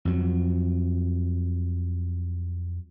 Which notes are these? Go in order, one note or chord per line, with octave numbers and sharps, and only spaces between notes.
F2 F#3